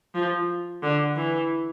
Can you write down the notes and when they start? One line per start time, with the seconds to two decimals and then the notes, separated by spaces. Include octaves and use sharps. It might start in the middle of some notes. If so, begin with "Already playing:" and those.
0.15 F3
0.82 D3
1.16 E3